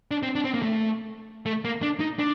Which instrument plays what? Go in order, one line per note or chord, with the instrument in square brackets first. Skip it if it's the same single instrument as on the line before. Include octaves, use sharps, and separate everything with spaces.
[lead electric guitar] D4
C4
D4
C4
A#3
A3
A3
A#3
D4
D#4
D4